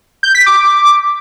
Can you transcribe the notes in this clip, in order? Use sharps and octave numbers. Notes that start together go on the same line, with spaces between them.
G6
B6
D6